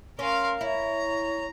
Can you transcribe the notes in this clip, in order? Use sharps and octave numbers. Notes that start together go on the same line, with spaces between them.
C#4 A#4 F5 C6
E4 C#5 A#5